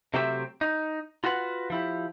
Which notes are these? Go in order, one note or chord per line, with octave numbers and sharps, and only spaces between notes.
C3 F#3 A3 C4 G4 E5
D#4
F4 F#4 B4 F#5
F3 E4 G4